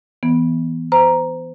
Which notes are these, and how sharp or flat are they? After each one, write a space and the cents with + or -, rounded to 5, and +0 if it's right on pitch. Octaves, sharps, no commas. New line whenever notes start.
E3 +0 B3 +0
C5 -30 A#5 +5